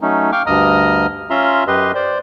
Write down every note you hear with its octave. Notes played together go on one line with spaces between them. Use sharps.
F#3 A3 C#4 D#4
F5 G5 C#6 D6 F6
D2 G2 D#5 A#5 D#6 F6
C#4 F4 E5 A#5 C6
F#2 G4 B4 D#5 C6
C5 D5